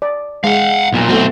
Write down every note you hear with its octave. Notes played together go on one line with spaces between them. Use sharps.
D5
G#3 F5 F#5
B1 A#2
B1 A3 B3 C4 F#4